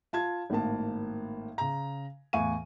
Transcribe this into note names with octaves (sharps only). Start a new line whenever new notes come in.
F4 A5 G#6
G#1 A2 A#3 A5
C#3 A#5
E2 A2 F5 G#5 C#6 D#7